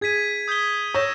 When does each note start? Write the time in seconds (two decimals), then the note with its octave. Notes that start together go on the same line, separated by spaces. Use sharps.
0.01 G#4 G#6 B6 D#7
0.48 D#6 G6 B6 G7
0.94 C#5 E6 G6 A#6 E7